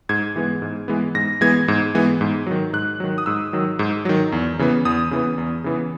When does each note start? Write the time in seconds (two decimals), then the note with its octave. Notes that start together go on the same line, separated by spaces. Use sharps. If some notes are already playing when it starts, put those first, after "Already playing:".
0.09 G#2 G#6
0.36 E3 G#3 B3
0.62 G#2
0.88 E3 G#3 B3
1.15 G#2 A#6
1.41 E3 G#3 B3 G#6
1.68 G#2
1.95 E3 G#3 B3
2.21 G#2
2.46 D#3 F#3
2.73 G#2 F#6
3.00 D#3 F#3
3.18 D#6
3.26 G#2 E6
3.53 D#3 F#3
3.79 G#2
4.05 D#3 F#3
4.32 E2
4.59 C#3 E3 B3
4.85 E2 D#6
5.11 C#3 E3 B3
5.38 E2
5.64 C#3 E3 B3